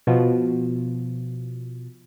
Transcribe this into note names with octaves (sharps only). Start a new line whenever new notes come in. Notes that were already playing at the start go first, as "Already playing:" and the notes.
B2 F3